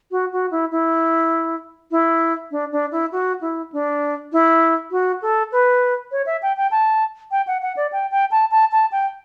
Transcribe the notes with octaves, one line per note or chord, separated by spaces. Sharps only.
F#4
F#4
E4
E4
E4
D4
D4
E4
F#4
E4
D4
E4
F#4
A4
B4
C#5
E5
G5
G5
A5
G5
F#5
F#5
D5
G5
G5
A5
A5
A5
G5